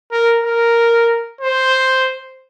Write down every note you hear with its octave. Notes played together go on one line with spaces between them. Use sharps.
A#4
A#4
C5